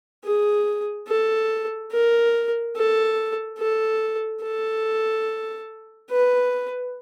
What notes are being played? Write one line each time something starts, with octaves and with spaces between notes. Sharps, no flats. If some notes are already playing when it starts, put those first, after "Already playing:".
G#4
A4
A#4
A4
A4
A4
B4